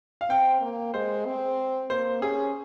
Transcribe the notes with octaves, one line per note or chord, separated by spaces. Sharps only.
F5
C4 G5
A#3
G#3 C5
C4
A#3 C5
C#4 G#4